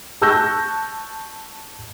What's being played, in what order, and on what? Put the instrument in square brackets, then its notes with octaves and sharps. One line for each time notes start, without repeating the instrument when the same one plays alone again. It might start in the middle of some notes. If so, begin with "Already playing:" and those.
[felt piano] A5 C#6 E6 F#6 G6 A#6